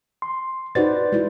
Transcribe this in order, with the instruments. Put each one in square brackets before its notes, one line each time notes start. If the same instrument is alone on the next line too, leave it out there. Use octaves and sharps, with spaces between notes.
[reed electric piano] C6
[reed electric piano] D#4 F#4 A6 [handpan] B4 C5 D5
[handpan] G#3 E4